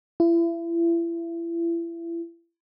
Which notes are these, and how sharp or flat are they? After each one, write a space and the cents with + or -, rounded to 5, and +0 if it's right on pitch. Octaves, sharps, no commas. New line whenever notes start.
E4 +35